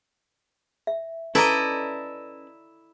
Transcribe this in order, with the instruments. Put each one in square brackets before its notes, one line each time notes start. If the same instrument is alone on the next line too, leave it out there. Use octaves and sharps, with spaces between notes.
[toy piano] E5
[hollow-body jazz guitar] C#4 B4 A5 [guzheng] E4 D5 D#5 [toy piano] A4 A#5